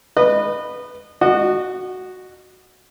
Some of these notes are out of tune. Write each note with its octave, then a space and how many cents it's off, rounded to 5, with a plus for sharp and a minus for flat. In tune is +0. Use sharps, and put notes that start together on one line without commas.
B4 +0 D#5 -30
F#4 +0 D#5 -35